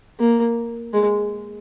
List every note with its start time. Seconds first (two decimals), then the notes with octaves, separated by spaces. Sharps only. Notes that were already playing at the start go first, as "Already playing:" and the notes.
0.20 A#3
0.93 G#3